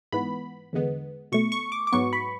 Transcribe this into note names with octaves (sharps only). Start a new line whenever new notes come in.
G#2 E3 B3 B5
E2 D3 G#3 B3
B2 A3 C#6
C#6
D6
D6
G#2 F#3 B3 C#6
B5